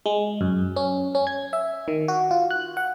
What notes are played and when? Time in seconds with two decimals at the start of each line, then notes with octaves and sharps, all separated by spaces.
0.06 G#3
0.41 F#2
0.76 C#4
1.15 C#4
1.27 G#6
1.53 E5
1.88 D#3
2.08 F#4
2.31 F4
2.51 F#6
2.77 F#5